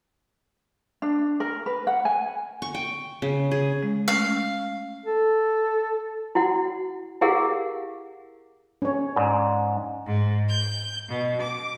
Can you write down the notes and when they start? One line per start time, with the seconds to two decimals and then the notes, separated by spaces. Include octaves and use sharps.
1.02 D4
1.40 A#4
1.66 B4
1.87 F#5
2.05 G#5
2.62 C#6
2.75 G5
3.22 C#3
3.51 G#4
3.83 G#3
4.08 A3 C#4 F5
5.06 A4
6.35 E4 F#4 F#5
7.21 E4 G4 G#4 A#4 F5 F#5
8.82 C#4 C#5
9.16 G#2 D5
10.07 G#2
10.49 G6
11.08 B2
11.41 D6